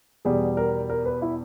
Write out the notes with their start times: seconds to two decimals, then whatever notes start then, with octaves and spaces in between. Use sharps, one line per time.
0.25 E2 B2 G3 G#4
0.57 A#4
0.90 A#4
1.06 B4
1.22 E4